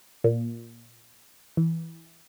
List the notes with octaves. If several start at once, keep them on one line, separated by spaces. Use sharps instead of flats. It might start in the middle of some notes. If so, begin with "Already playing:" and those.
A#2
E3